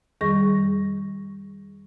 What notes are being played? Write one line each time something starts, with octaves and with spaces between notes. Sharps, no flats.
F2 D#3 G3 G#4 C#6 A#6